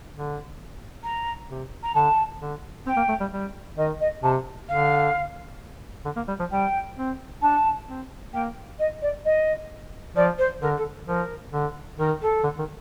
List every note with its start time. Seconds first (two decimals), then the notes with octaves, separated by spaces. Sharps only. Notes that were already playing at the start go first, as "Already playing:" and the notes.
0.12 D3
1.03 A#5
1.49 C3
1.83 A#5
1.94 D3 A5
2.40 D3
2.86 C4 G5
2.97 A#3
3.08 A3
3.20 G3
3.32 G3
3.77 D#3 D#5
4.00 D#5
4.22 C3 A5
4.68 D3 F5
6.05 D3
6.16 A#3
6.28 G3
6.40 F3
6.51 G3 G5
6.97 C4
7.42 D4 A5
7.88 C4
8.33 A#3 G5
8.79 D#5
9.02 D5
9.25 D#5
10.15 F3 D5
10.38 C5
10.61 D3 A#4
10.77 A4
11.07 F3 A#4
11.52 D3
11.99 D#3 A#4
12.21 A4
12.44 D3
12.59 D#3